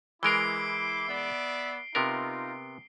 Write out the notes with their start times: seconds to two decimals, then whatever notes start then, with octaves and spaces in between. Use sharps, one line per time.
0.23 E3 G#3 E4 A#4 D6 C7 D7 G7
1.08 B3 D5 E5
1.95 C3 B3 D#4 F4 A#4